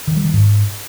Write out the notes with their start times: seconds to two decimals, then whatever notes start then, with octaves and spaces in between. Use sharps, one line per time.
0.07 D#3
0.16 G3
0.25 D#3
0.33 G#2